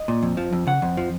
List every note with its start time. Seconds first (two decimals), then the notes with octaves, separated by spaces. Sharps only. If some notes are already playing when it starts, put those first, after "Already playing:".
Already playing: D#5
0.08 A#2
0.23 F2
0.37 F3
0.53 F2
0.67 C#3 F#5
0.82 F2
0.97 F3